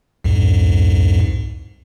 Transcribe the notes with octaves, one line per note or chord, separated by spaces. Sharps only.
C2 F2 G#2